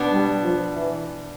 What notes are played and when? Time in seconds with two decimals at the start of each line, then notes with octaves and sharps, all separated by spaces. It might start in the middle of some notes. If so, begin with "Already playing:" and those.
Already playing: B2 B3 D4
0.12 G3
0.42 F3
0.74 E3